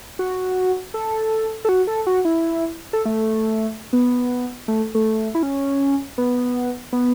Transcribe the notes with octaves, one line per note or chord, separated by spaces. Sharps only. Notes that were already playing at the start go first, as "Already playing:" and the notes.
F#4
A4
A4
F#4
A4
F#4
E4
A4
A3
B3
A3
A3
E4
C#4
B3
B3